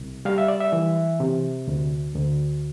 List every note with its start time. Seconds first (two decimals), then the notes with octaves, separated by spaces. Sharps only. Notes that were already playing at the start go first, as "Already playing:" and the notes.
Already playing: C2
0.25 G3 F5
0.38 E5
0.48 D5
0.60 E5
0.72 E3
1.20 C3
1.67 D2
2.15 D2